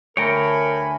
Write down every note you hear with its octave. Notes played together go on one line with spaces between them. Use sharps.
D2 A#4 C#5 G5 G#5 A#5 B5